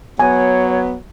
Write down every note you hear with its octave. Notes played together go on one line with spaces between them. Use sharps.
F#3 B3 C#5 G#5